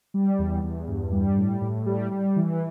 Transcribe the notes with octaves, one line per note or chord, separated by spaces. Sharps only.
G3
E2
E2
G2
G3
A2
A2
G3
G3
E3